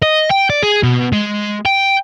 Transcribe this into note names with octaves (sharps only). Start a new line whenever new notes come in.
D#5
G5
D5
G#4
B2
G#3
G5